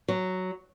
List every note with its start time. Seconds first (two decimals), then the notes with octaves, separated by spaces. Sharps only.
0.08 F#3